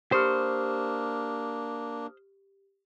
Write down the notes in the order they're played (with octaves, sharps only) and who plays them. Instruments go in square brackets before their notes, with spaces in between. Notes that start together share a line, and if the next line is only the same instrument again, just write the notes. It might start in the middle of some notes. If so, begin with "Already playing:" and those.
[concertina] A#3 D4 [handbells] G4 B5 C#6 [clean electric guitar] C5 [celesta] D#6 F6